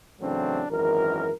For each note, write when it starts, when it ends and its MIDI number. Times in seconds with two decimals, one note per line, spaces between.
0.21 0.65 45
0.21 0.65 49
0.21 0.65 52
0.21 0.65 54
0.21 0.65 60
0.21 0.65 62
0.70 1.30 32
0.70 1.30 42
0.70 1.30 52
0.70 1.30 70